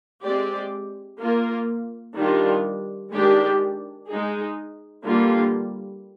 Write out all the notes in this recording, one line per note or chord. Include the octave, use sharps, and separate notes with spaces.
G#3 C4 G4 D5
A#3 F4 A#4
D#3 G3 D4 F4
D#3 G#3 D4 G4 D5
G#3 D#4 G#4
D3 G3 A#3 F4